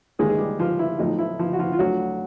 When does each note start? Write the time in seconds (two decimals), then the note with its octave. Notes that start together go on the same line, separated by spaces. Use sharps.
0.19 D#2 D#3 G#3 G#4
0.30 G#4
0.38 G3 G4
0.59 F3 F4
0.79 E4
0.99 B1 A2 F3 D#4
1.19 E4
1.39 F3 F4
1.53 F#4
1.59 F3 F4
1.72 F4
1.79 D2 D3 F3 F#3 F#4